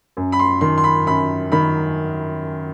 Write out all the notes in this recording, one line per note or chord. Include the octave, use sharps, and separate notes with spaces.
F#2
B5
C6
D#3 C6
C6
B5
F#2 B5
D#3 B5